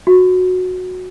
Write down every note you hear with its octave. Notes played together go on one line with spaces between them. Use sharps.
F#4